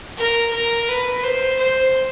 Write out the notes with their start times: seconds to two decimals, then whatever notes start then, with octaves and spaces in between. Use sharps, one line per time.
0.17 A#4
0.53 A#4
0.89 B4
1.23 C5
1.59 C5